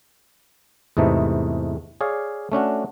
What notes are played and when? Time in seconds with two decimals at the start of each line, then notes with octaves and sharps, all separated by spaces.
0.97 E2 G#2 C3 E3 A3 D#4
2.01 G#4 C#5 D5 F5
2.52 A3 C#4 D4 F#4